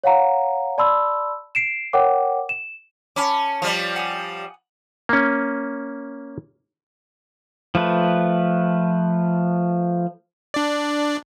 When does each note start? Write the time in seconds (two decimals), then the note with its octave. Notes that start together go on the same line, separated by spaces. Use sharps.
0.04 C#5 F5 F#5 A#5
0.78 D5 A5 B5 C6 E6
1.55 C7 D7 E7
1.93 A#4 C#5 F#5 G5 D6
2.49 E7
3.16 C#4 A5 B5 D6
3.62 F3 G3
3.96 F#5 G#5 D#6
5.09 A#3 C#4
7.75 F3 A3 B4
10.54 D4 D5